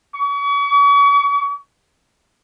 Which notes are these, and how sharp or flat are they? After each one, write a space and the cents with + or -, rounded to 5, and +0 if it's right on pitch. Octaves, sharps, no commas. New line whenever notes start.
C#6 +40